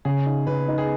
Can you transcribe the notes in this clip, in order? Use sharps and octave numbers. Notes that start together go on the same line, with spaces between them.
C#3 G#4
D#4
C#3 B4
D#4
G#4